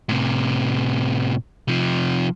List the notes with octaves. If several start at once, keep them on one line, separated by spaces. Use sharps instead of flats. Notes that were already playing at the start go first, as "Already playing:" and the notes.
A2 C3
C3 F3